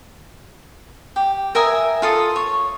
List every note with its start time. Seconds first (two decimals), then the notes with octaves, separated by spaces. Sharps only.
1.16 G4
1.55 A#4 E5 G#5 D#6
2.02 F4 A4 D#6
2.36 C#5